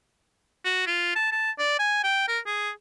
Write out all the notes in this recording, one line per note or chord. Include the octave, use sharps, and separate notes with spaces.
F#4
F4
A5
A5
D5
G#5
G5
A#4
G#4